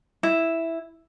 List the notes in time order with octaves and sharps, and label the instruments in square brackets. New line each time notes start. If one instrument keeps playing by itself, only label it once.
[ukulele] E4